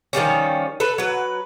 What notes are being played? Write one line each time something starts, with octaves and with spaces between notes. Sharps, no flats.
D#3 F3 G3 C#4
A4 B4
F#3 B4